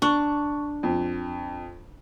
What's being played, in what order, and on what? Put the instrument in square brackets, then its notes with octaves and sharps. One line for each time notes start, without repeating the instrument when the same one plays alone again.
[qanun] D4 [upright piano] C#6
[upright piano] F2